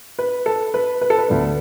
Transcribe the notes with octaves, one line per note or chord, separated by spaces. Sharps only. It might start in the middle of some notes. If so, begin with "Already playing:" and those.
B4
A4
B4
B4
A4
B4
D2 D3 B3 D4